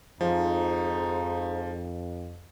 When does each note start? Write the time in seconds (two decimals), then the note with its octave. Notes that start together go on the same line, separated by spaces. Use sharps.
0.21 F2 G#2 F3 D#4